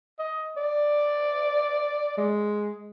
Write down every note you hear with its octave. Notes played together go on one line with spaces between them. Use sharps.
D#5
D5
G#3